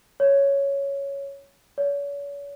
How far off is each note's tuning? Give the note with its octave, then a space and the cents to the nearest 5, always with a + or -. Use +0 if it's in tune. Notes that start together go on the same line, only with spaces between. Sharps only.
C#5 +5
C#5 +40